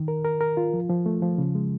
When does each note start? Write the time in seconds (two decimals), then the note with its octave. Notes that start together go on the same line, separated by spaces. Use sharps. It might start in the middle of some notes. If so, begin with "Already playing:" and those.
Already playing: D#3
0.08 A#4
0.25 A#4
0.41 A#4
0.57 F4
0.74 F3
0.90 F3
1.06 A3
1.22 F3
1.38 C#3
1.55 G#3